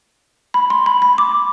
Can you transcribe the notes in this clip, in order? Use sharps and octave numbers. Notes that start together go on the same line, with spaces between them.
B5
C6
B5
B5
D6